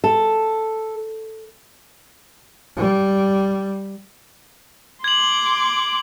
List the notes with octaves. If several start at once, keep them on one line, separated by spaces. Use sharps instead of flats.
A4
G3
C6 D6 G#6 F#7